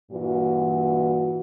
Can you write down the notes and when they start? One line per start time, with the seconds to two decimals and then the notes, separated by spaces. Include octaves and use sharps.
0.11 G2 A#2 E3 F#4